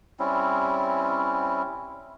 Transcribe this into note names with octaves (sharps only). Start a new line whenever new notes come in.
G3 C4 C#4 E4